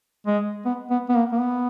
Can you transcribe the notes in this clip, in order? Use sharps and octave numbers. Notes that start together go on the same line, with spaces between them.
G#3
B3
B3
B3
A#3
A#3
B3